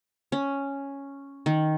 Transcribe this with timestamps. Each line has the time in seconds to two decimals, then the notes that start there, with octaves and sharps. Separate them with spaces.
0.32 C#4
1.46 D#3